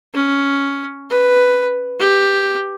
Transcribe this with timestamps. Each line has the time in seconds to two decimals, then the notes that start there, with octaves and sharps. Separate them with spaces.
0.14 C#4
1.10 B4
2.00 G4